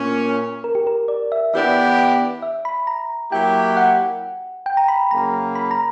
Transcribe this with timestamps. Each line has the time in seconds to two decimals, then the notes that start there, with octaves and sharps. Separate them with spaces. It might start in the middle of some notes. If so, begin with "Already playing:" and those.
Already playing: A#2 A#3 C#4
0.64 A#4
0.75 G4
0.87 A#4
1.08 D5
1.32 E5
1.53 E3 B3 D4 G4 E5
2.42 E5
2.65 B5
2.87 A#5
3.32 F#3 A#3 E4 G4 G5
3.77 F#5
4.66 G5
4.77 A#5
4.88 B5
5.11 C#3 F#3 A#3 A#5
5.55 B5
5.71 A#5